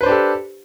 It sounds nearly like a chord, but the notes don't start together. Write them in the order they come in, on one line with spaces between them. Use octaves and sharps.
B4 C5 D4 G4 A4